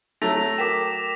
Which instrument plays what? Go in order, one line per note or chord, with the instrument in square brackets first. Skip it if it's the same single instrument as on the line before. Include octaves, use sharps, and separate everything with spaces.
[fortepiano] F#3 A3 [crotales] A#6 F7
[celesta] A#4 G5 [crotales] D6 B6 E7